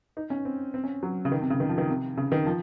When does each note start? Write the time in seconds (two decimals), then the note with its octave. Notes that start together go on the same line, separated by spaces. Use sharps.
0.17 D#4
0.30 C#4
0.45 C4
0.74 C4
0.84 C#4
1.03 F#3
1.25 C#3
1.32 D#3
1.41 C3
1.50 C#3
1.60 D#3
1.69 F3
1.78 D#3
1.89 C3
2.17 C#3
2.32 D#3
2.46 F3